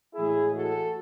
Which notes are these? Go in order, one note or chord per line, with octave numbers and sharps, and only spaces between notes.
A2 E3 G#3 E4 G#4
F#4 A4